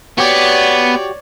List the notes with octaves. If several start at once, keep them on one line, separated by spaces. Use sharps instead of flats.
B3 F#4 G4 C#5 D5